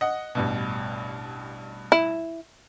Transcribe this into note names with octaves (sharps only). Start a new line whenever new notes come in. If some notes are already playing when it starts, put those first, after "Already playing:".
D#5 F#5
A1 G2 B2
E4